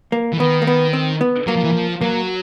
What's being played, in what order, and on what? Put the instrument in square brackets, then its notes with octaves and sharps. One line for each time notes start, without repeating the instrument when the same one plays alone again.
[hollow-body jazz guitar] A#3
[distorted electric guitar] E3
[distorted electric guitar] D#3 [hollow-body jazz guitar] B3
[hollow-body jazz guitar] A#3
B3
C4
B3
[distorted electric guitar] F#3 [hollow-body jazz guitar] A#3
[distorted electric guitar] F3
E3
F3
[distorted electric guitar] F#3 [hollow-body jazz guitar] A#3